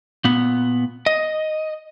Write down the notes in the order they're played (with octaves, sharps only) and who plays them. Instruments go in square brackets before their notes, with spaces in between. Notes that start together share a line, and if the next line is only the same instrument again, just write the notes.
[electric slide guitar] A#2 B3
D#5